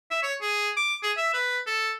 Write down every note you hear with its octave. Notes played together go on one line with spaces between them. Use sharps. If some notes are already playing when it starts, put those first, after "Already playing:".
E5
C#5
G#4
D6
G#4
E5
B4
A4